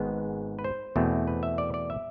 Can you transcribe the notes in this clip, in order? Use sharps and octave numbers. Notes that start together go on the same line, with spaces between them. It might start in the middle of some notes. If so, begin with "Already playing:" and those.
Already playing: G#1 G#2 G#3 B3
B4
C5
E2 B2 A3 C4
B4
E5
D5
D5
E5